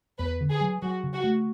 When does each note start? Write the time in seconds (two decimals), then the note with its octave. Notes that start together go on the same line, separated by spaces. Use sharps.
0.19 E2 B4
0.41 D3
0.50 G#4
0.61 F#3
0.82 F#3 F#4
1.04 C#3
1.14 F#4
1.24 A3